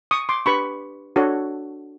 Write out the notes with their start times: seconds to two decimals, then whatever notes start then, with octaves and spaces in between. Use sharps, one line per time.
0.11 C#6 D#6
0.29 C6 D6
0.46 D4 G4 B4 B5 C#6
1.16 D4 F#4 A4 C#5